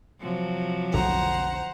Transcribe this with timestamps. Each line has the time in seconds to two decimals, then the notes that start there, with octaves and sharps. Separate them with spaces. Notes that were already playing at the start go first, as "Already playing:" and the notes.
0.21 C3 F3 F#3
0.94 F1 B1 D3 C5 F#5 A#5